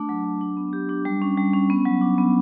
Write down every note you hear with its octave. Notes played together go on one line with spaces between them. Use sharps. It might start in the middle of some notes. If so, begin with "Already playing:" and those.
Already playing: A3 D4
F#3
F#3
D4
B3
G4
D4
G3
C#4
G3
C#4
B3
F#3
D4
B3